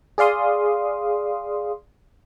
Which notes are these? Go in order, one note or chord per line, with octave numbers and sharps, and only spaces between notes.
G#4 D5 F5 C6 D#6